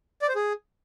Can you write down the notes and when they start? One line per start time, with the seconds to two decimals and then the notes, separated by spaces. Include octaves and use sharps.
0.22 D5
0.29 C5
0.35 G#4